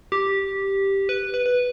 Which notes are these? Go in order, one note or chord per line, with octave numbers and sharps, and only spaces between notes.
G4
B4
B4
B4